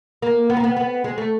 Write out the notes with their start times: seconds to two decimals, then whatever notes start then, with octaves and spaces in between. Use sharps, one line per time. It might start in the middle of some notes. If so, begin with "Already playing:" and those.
0.22 A#3
0.50 B3
0.57 A#3
0.64 B3
0.77 B3
1.04 G#3
1.18 A3